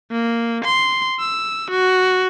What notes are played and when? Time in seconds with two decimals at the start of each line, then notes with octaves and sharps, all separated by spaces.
0.12 A#3
0.65 C6
1.20 E6
1.71 F#4